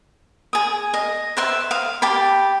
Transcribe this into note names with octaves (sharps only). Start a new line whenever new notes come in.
G#4 D#6
D#5
B4 C5 E5
F5 D#6
G4 A5 B5